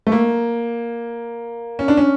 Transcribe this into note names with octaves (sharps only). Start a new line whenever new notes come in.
A3
A#3
C#4
D4
C#4